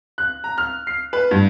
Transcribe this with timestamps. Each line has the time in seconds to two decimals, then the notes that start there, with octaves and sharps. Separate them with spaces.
0.18 F#6
0.44 A#5
0.58 F6
0.87 C7
1.13 B4
1.31 G2